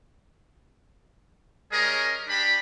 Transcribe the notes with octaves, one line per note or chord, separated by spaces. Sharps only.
G3 C#4 G#4 A#4 C#5 D#5
D4 G4 B5